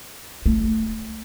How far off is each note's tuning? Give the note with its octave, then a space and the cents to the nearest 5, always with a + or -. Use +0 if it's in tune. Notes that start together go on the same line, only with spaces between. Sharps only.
A3 +5